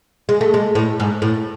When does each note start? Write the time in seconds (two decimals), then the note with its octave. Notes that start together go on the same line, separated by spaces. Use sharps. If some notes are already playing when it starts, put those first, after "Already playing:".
0.29 G#3
0.41 A3
0.54 G#3
0.75 A2
1.00 G#2
1.22 A2